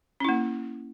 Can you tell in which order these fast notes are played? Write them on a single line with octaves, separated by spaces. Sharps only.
C#4 E4 A#3